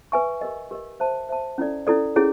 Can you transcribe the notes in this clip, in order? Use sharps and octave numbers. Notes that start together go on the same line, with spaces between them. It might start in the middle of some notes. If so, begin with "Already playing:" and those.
B4 E5 G#5 C#6
G4 A#4 D#5
G4 A#4 D#5
C5 E5 A5
C5 E5 A5
C#4 E4 A4 D5
C#4 E4 A4 D5
C#4 E4 G#4 C#5